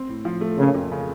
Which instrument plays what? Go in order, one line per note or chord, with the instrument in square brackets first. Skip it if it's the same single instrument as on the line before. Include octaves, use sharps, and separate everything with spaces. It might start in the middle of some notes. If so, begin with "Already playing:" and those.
Already playing: [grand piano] C4
A2
F3
A3
[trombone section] C#3 [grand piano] A#3
[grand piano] F2
C#3